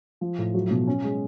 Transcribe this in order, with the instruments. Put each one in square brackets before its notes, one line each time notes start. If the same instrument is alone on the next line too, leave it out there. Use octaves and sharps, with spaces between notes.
[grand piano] F3
A2
F#3
B2
C#4
G#3